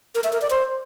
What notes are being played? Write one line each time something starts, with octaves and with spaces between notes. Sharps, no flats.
A#4
E5
A#4
D5
C5